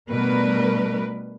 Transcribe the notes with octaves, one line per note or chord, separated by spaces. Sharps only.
B2 G3 A3 D4 A#4 B4